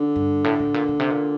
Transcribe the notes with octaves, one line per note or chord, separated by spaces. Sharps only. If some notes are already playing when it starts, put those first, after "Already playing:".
Already playing: D3
G2
A2
A2
A#2
A#2
C3
A#2